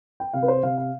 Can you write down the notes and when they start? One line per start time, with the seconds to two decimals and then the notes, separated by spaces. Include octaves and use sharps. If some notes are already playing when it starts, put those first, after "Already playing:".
0.20 G5
0.33 C3 F5
0.42 B4
0.48 C5
0.63 C3 F5
0.78 F5